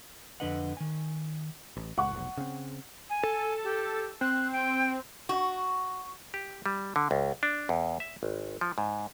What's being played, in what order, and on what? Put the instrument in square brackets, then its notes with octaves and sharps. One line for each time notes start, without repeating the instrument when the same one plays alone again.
[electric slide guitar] F2 D3 D4 B4 D#5 F#5
D#3 G#5
[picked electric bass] A1
[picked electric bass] C#2 [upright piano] F#5 C#6
[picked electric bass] F1 B1
C#3 C4
[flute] G#5
[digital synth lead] A4
[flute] G4
[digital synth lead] C4 [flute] F#6
[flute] G5
[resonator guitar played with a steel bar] F#4
[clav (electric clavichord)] G4
G3
D3
C#2
D4
E2
E5
G#1
F3
G#2